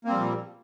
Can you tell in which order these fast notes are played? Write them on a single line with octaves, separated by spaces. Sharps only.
A#3 C4 G3 F3 A#2